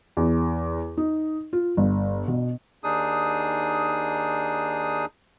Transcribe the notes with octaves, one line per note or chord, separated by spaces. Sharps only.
E2
D#4
F4
G1
B2
D#2 D4 D#4 G#4 D#6